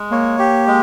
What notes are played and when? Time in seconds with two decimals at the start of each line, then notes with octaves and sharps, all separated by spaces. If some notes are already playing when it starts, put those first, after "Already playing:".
Already playing: G#3
0.11 A#3 C#5
0.39 G4
0.67 G#3